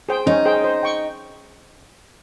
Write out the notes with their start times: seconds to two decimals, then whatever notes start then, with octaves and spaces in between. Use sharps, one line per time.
0.09 G#4 C5 G5
0.26 C#4 D#4
0.45 G#4 C5 G5
0.64 C5
0.83 G5 C#6